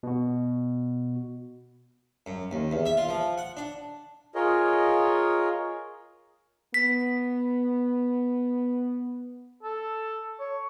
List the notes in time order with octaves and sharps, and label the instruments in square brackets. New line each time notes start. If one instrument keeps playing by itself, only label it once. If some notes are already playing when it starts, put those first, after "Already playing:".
[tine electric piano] B2 F#4
[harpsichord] F#2
D#2
E2
E5
F4
F3
F#5
D4
[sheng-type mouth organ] F4 G#4 A#4 C#5 D#5
[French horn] B3 [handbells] B6
[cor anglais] A4
C#5